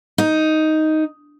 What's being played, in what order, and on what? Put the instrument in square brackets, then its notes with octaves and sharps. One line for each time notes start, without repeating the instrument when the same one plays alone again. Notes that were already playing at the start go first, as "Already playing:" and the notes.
[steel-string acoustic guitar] D#4